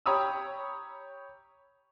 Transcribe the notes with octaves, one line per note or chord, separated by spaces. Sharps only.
G4 C#5 A#5 B5 D#6 E6